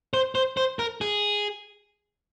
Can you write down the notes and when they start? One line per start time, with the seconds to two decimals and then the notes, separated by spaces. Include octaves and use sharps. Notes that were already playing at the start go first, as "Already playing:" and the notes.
0.14 C5
0.35 C5
0.57 C5
0.79 A#4
1.01 G#4